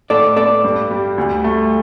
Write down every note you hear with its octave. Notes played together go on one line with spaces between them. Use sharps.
A2 A4 D5
B3 A4 D5
G2
G3
D2
A3